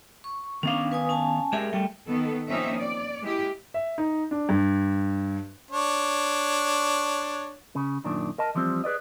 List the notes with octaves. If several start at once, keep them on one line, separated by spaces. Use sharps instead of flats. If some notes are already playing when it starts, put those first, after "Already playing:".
C#6
D#3 B3 C#4 D4 F5
B4 G#5 D#6
C#4 G#5 A5
G#3 G4 G#4 A#4 E5
G3 A3 G5
D#3 B3 A4
F3 A#3 C4 C#4 D#4 E5
D5
G#3 E4 G4
E5
D#4
D4
G2
D4 C#5
C#3
F#2 A#2 D#3 D4
A#4 D#5 A5
E3 F3 G3 C4
G#4 B4 D5 D#5